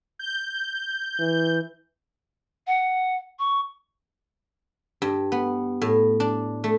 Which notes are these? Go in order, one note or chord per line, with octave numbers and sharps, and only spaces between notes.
G6
E3
F#5
C#6
G2
B3
A2
D4
A3